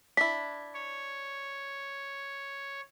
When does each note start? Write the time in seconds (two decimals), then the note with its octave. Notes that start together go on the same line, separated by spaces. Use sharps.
0.17 D4 E4 B6
0.74 C#5